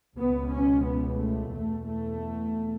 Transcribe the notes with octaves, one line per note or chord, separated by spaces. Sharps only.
C#2 B2 B3
C#4
B3
A3
E2 B2 A3
A3